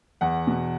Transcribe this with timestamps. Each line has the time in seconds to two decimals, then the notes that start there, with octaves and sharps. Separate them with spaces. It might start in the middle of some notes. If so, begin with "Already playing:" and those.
0.21 E2 F#5
0.47 B2